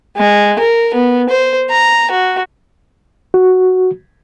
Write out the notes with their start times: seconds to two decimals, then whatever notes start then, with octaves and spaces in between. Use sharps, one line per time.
0.17 G#3
0.59 A#4
0.95 B3
1.30 C5
1.71 A#5
2.11 F#4
3.34 F#4